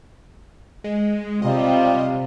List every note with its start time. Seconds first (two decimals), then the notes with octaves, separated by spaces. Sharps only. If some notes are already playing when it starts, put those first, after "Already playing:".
0.84 G#3
1.42 C3 G3 F4 D#5